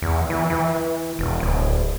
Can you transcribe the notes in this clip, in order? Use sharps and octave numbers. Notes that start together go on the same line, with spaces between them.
E2
E3
E3
E1
D1